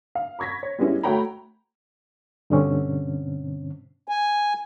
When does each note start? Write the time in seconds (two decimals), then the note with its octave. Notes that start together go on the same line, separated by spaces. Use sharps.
0.15 F5
0.39 B5 C#6 G#6 A#6 B6
0.63 C#5
0.79 G3 G#3 B3 C#4 E4
1.03 A3 F#4 C#5 G5 A#5 B5
2.50 G2 B2 D3 C4 C#4
4.08 G#5